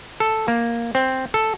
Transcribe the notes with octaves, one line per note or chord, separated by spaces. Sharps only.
A4
A#3
C4
A4